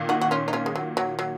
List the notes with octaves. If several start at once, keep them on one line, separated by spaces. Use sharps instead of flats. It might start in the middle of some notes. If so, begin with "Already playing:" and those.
Already playing: A#2 D#3
D#4 F#4
F#4
C#4 F4
D#4
C#4 F4
G#3
F#3
F#3
F#3